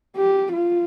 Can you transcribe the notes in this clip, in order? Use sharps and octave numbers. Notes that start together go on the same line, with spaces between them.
G4
F4